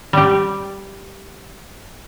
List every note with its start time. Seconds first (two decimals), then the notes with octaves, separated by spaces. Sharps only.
0.13 G3 G4